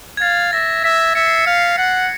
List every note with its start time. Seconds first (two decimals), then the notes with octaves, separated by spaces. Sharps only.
0.17 G#6
0.22 F5 A6
0.53 E5 A#6
0.84 E5 B6
1.15 E5 C#7
1.27 C7
1.38 C#7
1.47 F5
1.72 B6
1.78 F#5 C7